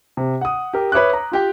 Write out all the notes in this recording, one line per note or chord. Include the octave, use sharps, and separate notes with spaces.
C3
F#5 D#6
G4 A#4
B4 C#5 E5 D6 F#6
A#5
F4 G4 G5